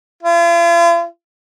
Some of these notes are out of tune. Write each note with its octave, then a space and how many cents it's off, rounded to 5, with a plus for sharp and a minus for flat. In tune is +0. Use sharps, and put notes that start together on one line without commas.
F4 -45